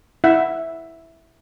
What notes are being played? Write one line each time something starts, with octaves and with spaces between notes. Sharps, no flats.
E4 E5 F#5